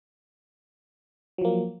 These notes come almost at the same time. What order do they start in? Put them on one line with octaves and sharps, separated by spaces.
F#3 F3 A#3